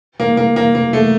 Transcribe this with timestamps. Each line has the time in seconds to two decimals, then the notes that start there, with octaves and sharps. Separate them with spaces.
0.20 A#3
0.37 A#3
0.56 A#3
0.75 A#3
0.93 A3